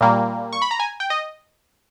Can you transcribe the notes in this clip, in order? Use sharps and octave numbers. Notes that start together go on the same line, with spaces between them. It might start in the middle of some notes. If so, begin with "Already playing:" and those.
A#2 G3 A#3
C#6
B5
A#5
G#5
G5
D#5